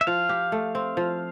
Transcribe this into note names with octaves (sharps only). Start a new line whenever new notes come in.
E5
F3 F5
G4
A3
C4
F3